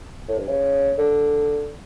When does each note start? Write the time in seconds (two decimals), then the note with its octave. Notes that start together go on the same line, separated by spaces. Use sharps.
0.28 A2
0.38 G2
0.48 C#3
0.98 D3